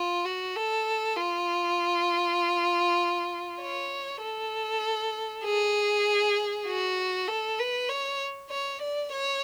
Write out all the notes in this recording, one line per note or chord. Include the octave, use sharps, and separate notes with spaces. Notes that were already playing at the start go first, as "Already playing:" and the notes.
Already playing: F4
F#4
A4
F4
C#5
A4
G#4
F#4
A4
B4
C#5
C#5
D5
C#5